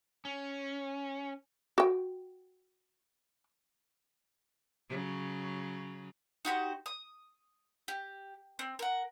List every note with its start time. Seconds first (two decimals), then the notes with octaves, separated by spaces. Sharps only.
0.25 C#4
1.78 F#4 G5
4.89 C#3 F#3
6.45 D#4 F#4 G4 C5
6.86 D#6
7.88 G4
8.59 C4
8.79 A#4 F#5